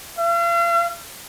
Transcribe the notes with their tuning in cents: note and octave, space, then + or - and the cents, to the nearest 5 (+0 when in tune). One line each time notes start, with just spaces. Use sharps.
F5 -40